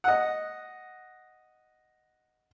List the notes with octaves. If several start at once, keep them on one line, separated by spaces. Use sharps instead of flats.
D#5 F#5